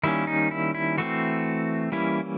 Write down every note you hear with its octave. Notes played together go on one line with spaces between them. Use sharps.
D#3 G3 A#3 C#4 E4
D#4
E4
E4
E3 A3 C4 F#4
E3 G3 A#3 C#4 E4